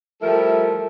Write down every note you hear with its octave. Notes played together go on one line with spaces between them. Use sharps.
F3 G3 A3 E4 A4 A#4